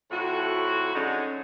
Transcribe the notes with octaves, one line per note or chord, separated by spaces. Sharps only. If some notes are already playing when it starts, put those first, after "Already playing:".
F2 A2 F#4
D3 F#3 G#3 C#4 D#4